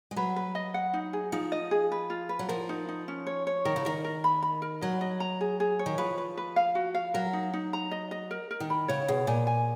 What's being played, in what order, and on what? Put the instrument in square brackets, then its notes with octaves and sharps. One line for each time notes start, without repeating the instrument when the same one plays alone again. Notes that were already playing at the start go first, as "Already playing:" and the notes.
[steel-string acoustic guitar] G#3
[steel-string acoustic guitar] F#3 [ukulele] B4
[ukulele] B4
D#5
F#5
D#4
G#4
[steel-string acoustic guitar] F3 [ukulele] D#4
[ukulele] D#5
G#4
B4
F4
B4
[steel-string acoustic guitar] F#3
[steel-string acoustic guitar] F3 [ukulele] A#4
[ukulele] D#4
D#4
C#4
C#5
C#5
[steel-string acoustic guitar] D#3 [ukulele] A#4
[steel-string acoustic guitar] C#3
[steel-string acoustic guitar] D#3 [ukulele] A#4
[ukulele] A#4
B5
B5
A#4
[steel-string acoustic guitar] F#3 [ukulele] D#5
[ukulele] D#5
A#5
G#4
G#4
C#5
[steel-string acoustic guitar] D#3
[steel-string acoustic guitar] F3 [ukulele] B4
[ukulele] B4
B4
F5
F#4
F5
[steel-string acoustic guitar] F#3 [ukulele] A#4
[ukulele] D#4
D#4
A#5
D#5
D#5
A#4
A#4
[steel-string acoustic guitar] D#3
[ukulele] B5
[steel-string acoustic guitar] C#3 [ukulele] C#5
[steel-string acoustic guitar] B2 [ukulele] G#4
[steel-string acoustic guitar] A#2 [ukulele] G#5
[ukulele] G#5